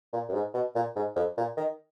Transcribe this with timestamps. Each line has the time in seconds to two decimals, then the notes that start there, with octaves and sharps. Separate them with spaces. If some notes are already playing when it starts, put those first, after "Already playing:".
0.13 A#2
0.29 F#2
0.33 G#2
0.54 B2
0.75 A#2
0.96 G#2
1.16 F2
1.37 A#2
1.57 D#3